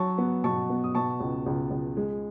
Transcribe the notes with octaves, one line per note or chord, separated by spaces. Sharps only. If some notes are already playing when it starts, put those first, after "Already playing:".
Already playing: F#3 A5 C#6
B3
B2 A5 C#6
B3
D#6
B2 A5 C#6
C#2
C#2
C#2
G#3